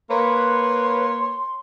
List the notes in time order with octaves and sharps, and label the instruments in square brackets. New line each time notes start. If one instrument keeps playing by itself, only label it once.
[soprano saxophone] A#3 [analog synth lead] B4 [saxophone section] C#5 [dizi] C6